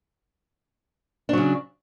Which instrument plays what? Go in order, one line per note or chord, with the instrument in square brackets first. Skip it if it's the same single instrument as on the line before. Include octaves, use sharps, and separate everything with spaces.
[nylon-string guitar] D4
F#3
C#3